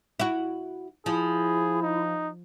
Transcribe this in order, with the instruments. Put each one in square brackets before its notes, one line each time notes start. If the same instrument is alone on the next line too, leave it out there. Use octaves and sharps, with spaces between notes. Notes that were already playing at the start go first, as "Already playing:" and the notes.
[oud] E4 F#4
[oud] F3 [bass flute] E4 [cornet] G#4
[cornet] D#4